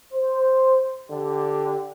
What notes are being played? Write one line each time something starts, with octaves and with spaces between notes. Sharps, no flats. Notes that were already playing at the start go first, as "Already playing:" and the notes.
C5
D3 G4